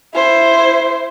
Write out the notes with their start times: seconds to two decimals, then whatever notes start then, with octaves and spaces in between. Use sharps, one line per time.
0.14 E4 C5